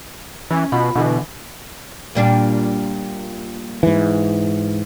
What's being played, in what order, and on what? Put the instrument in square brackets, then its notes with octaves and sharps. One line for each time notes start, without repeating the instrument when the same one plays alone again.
[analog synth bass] E3 [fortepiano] C#4
[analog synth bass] B2 [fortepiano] F4 B5
[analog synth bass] B2 [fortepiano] D3 E3
[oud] A#2 G3 D4
[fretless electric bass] G#2 E3